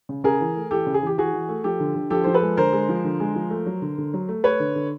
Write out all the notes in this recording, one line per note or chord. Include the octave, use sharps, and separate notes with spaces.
C#3
C#3 G#4 A#4
E3
A3
E3 G4 A4
C#3
G#4
E3 G4
E3 F#4 G#4
E3
A3
F3 G4 A4
D3
D3
F3 G4 A4
F3 C5
A4 B4
G#3
D3 A#4 C5
G#3
F3
D3
G#3
F3
A3
F#3
D3
D3
F#3
A3
A3 B4 C#5
D3
D3